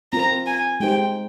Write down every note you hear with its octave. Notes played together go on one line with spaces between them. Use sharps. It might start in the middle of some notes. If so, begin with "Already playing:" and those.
C4 F4 A#4 A#5
G#5
G#3 D#4 G4 C5 G5